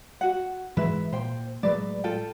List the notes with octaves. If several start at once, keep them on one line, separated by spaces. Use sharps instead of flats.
F#4 F#5
G#2 E3 G#3 B4 E5
A#2 C5 G5
A2 F#3 G#3 B4 D5
F4 A4 G5